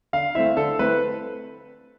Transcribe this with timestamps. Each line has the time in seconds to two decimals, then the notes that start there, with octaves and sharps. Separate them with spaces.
0.13 D3 F5
0.35 A3 C4 E4 E5
0.57 D3 A4
0.79 A3 C4 E4 B4